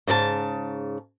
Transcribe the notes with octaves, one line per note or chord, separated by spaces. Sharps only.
G#2 C#3 A4 A5